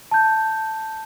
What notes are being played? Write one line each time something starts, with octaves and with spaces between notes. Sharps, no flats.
A5 G6